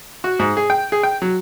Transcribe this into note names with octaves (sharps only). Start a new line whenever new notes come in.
F#4
G#2
G#4
G5
G#4
G5
F#3